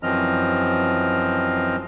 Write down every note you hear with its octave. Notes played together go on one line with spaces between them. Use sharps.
F#2 E3 F3 C4 D#5 F6